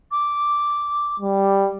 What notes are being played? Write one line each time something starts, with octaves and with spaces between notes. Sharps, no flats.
D6
G3